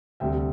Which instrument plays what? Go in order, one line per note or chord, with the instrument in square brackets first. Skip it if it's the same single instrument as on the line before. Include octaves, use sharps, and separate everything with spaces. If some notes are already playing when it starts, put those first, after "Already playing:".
[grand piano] D2 C3 G3 E5 G5